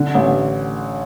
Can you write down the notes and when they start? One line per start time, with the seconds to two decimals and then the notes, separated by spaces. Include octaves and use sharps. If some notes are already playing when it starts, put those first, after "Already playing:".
Already playing: D3
0.15 A1